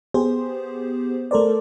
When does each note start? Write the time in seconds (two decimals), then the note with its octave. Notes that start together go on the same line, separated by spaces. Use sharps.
0.14 B3 G4 G#4 C5
1.31 A3 A4 A#4 C5 D5